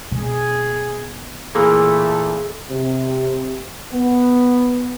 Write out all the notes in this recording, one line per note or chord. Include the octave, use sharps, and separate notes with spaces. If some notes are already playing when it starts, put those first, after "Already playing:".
B2 G#4
A#2 E3 A3 A#3 G#4 A4
C3
B3